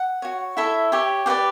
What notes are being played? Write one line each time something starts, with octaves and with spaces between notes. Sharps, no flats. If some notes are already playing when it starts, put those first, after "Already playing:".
Already playing: F#5
F#4 C#5
E4 A4 C#5 E5
G4 C#5
G4 B4 D5 F#5